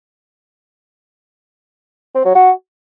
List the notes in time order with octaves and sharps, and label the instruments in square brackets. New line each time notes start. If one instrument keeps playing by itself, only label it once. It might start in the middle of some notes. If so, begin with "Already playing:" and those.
[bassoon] C4
F#3
F#4